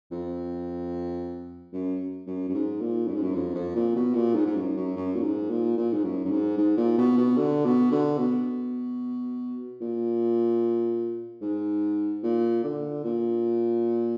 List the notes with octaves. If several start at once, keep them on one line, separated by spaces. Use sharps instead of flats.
F2
F#2
F#2
F#2
G#2
A#2
F#2
G#2
F#2
F2
F2
A#2
B2
A#2
G#2
G#2
F#2
F#2
F#2
A#2
G#2
A#2
A#2
G#2
F#2
F#2
G#2
G#2
A#2
B2
B2
D3
B2
D3
B2
A#2
G#2
A#2
D3
A#2